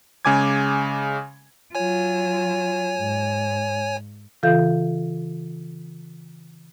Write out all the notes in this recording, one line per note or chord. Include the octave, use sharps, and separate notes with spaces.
C#3 G#3 G#5 D6 G#6
F#3 F4 C#5 G#5
G#2
C#3 E3 F4 A4 F5 G6